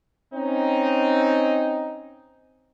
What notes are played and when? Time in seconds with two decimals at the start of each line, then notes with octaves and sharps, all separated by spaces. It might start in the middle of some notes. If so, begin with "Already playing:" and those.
0.34 C4 C#4 D#4